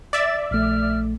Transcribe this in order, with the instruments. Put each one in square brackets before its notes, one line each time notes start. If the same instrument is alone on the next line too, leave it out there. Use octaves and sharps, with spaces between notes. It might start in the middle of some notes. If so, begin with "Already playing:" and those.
[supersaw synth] D5 E5 [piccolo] A6
[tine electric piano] A#1 A3 [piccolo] F6